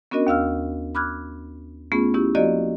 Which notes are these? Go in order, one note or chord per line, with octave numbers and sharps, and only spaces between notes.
B3 C#4 D4 F#4 A#4 D#5
D#2 F5 E6 F6
B5 D6 F6 F#6 G#6
A3 B3 C#4 F4 G#4
B3 C#4 E4 G4
F3 A#3 F#4 G4 D5 D#5